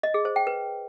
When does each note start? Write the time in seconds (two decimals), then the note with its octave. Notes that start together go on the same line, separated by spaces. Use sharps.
0.03 D#5
0.14 G#4
0.25 C5
0.36 G5
0.47 B4